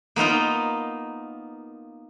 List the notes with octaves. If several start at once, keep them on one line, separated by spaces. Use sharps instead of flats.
A#3 B3 D#4 F4